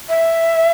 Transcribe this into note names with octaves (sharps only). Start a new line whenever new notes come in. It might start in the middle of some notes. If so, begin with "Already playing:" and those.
E5